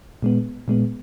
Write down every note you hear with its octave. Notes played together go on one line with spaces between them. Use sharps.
A#2 G#3 B3
A#2 G#3 B3